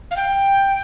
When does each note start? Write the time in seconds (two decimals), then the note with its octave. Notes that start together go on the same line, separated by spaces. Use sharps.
0.11 F5
0.16 G5